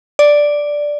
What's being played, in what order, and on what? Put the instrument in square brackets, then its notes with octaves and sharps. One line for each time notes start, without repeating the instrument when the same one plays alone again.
[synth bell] D5